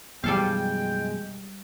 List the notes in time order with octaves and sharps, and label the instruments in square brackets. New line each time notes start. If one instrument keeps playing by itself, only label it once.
[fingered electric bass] F#2 B2 E3 [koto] G3 A4 F5 [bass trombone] G#3 [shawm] G5